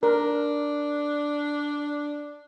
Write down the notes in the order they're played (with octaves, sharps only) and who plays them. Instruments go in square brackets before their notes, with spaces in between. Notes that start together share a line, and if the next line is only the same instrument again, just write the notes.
[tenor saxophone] D4 [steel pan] A#4